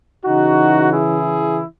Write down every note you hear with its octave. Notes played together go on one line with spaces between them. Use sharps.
C#3 E3 D#4 F#4
E4 G#4